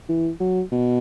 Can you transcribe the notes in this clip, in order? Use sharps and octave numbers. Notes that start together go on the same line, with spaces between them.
E3
F#3
B2